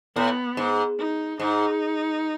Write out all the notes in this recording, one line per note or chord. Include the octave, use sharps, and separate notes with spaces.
A2 B3
G#2
D#4
G#2 D#4